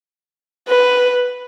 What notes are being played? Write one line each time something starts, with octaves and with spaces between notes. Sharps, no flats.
B4